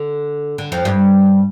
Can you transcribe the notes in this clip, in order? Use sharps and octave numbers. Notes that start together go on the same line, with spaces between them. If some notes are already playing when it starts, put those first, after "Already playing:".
Already playing: D3
D3
F2 F3
G2 G3